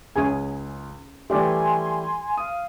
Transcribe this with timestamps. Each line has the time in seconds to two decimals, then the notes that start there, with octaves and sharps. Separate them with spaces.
0.16 C#2 C#4 G#4 G#5
1.30 E3 G3 A3 G4 D5 G#5 C6
2.37 F5 D#6